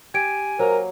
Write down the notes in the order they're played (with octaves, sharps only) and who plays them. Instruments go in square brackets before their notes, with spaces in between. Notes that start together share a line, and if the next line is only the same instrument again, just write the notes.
[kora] G4 [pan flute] G#5 [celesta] G#6 D7
[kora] F#3 A#3 [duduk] A#4 [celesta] C5